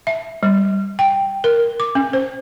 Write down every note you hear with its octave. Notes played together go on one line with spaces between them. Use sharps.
E5
G3
G5
A#4
D6
C#4
C5